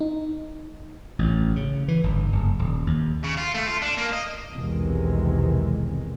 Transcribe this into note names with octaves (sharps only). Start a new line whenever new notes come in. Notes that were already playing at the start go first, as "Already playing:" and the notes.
D#4
A1
C#3
E3
G1
F#1
D#1
D#2
C#3
F4
A3
F4
D4
A#3
D#5
B1 E2 C3 D#3 G#3